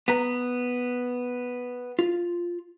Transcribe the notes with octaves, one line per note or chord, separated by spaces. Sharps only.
B3 B4 A#5
F4